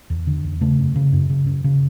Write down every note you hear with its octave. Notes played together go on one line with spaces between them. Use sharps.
E2
D3
E2
C#3 A3
F#2
C#3
F#2
C#3
F#2
C#3